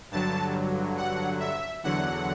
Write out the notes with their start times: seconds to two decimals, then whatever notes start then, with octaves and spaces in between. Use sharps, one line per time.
0.11 G2 D3 F#3 A5
0.98 F#5
1.40 E5
1.83 E2 D3 F#3 F#5